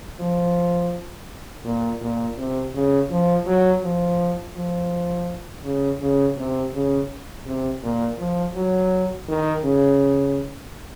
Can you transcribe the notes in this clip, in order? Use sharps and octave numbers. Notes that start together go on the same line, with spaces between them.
F3
A#2
A#2
C3
C#3
F3
F#3
F3
F3
C#3
C#3
C3
C#3
C3
A#2
F3
F#3
D#3
C#3